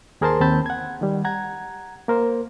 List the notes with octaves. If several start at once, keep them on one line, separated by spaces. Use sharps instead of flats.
D#2 G#4 A#4 C5 A5 C6
D#2 C4 A5 B5 G6
F#5 G#6
D#3 G3
F#5 A#5 G#6
A#3 A#4 C5